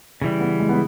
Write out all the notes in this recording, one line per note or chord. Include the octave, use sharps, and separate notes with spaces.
C#3 E3 G3
B3
G#3
B3